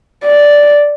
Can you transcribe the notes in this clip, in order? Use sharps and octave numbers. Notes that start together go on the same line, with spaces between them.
D5